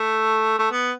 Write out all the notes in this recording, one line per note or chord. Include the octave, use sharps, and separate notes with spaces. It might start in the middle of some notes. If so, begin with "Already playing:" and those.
Already playing: A3
A3
B3